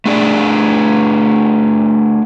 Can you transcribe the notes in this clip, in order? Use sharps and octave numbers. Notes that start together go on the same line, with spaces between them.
A3 D4 G#4 D5